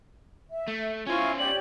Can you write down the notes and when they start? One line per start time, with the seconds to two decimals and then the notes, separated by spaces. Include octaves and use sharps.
0.51 E5
0.68 A3
1.07 C#4 E4 F4 C5 G#5 C#6
1.39 G4 C#5 D5 F#7